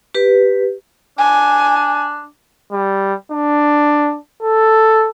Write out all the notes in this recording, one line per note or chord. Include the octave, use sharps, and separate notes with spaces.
G4 B4
D4 G#5
G3
D4
A4